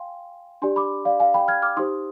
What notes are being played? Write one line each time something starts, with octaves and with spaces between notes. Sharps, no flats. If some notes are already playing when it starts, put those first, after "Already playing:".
Already playing: F5 G5 G#5 C6
D4 G4 D5 G#5 C6
B5 D6
D5 F5
F5 G#5
G5 B5
F6 G#6
D6 F6
D#4 G4 C5 C6 D#6